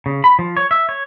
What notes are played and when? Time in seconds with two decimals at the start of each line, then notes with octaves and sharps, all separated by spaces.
0.06 C#3
0.24 B5
0.39 F3
0.57 C#5
0.71 E5
0.89 C#5